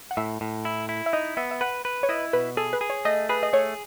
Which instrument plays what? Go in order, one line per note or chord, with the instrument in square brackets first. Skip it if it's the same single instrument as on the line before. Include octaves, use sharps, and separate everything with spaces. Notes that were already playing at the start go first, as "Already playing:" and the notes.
[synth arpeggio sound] F#5
[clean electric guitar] A2 [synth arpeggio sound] E5
[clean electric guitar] A2
E4
E4
[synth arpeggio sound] E5
[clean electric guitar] D#4 [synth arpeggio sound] D#5
[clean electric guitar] B3 [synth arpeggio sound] E5
[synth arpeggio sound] E5
[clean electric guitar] B4 [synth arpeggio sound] F#5
[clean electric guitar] B4
[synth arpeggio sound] C#5
[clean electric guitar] E4 [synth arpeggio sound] D#5
[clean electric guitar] B2 [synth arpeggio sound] B4
[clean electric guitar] G#4 [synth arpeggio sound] A4
[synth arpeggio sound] B4
[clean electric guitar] G#4
[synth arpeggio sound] C#5
[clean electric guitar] A3 [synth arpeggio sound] D#5
[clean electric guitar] G#4 [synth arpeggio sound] B4
[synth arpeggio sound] D#5
[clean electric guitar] A3 [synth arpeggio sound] C#5